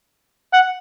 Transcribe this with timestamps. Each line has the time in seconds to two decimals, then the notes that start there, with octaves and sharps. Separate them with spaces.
0.53 F#5